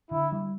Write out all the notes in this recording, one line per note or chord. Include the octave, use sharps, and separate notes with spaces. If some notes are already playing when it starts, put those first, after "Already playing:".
D3 E4
G3